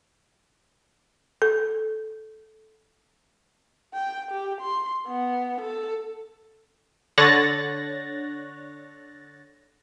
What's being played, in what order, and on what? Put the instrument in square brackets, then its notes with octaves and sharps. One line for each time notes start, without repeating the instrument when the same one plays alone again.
[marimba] A4
[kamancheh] G5
G4
C6
B3
A4
[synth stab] D3 C#5 F#6 A6 A#6